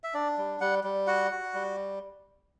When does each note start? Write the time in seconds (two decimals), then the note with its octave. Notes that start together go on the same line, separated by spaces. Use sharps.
0.04 E5
0.14 D4 D5
0.38 G3
0.61 G3 F#5
0.84 G3
1.07 F#4 F#5
1.31 F#4
1.54 G3